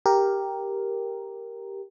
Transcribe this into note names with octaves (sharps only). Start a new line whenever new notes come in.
G4 A#4